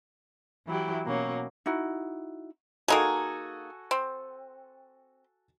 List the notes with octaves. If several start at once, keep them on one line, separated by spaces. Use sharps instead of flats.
E3 F#3 E4 G4
B2 F#3 A#3 C#4
D#4 E4 F#4
A#3 D#4 F#4 G#4 A4 G#5
C4